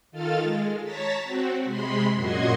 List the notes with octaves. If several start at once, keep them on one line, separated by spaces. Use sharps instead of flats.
D#3 F4 A4 F5 F6 A6
G#3
C#5 A5 A#5 A6 B6
C4 F#4
C3 G#3 B5 C6
F#2 A#2 F#4 D#5 C6 G#6